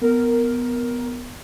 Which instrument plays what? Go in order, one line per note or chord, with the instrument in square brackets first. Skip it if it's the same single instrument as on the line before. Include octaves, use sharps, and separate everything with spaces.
[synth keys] B3 [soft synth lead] A#4